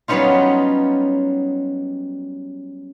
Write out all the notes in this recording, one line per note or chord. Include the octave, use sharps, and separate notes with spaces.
F#3 G3 B3 C#4 D#4 F4